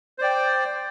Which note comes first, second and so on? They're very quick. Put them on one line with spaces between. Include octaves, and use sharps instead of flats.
C5 D5 G5